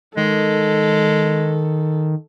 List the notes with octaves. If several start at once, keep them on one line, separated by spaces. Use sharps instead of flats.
D#3 G#3 A4